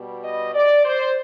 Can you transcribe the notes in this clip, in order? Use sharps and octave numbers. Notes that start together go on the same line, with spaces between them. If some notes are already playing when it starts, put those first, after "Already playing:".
Already playing: B2 G3
D#5
D5
C5